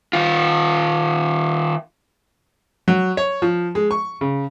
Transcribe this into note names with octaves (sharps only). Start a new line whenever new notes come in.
D#3 F4
F#3
C#5
F3
G#3
C#6
C#3